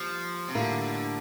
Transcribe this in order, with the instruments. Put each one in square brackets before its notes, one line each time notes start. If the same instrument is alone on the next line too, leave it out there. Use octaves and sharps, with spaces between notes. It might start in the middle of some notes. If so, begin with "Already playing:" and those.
Already playing: [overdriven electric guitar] F3 [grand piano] G3 A#3
[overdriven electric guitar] C3
[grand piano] A2 G3 A#3 F4 A#4 [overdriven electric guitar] D3